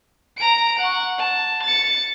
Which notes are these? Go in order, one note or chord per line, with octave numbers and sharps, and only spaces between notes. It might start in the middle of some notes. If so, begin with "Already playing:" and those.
A#5 D7
F#5 C#6
A5
A6 C#7